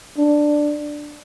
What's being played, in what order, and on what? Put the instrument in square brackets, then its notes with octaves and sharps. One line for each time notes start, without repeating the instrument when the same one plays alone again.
[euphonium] D4